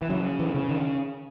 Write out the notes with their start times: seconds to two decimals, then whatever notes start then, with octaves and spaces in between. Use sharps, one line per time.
0.02 E3
0.09 C#3 F#3
0.39 E3
0.54 C#3
0.69 D#3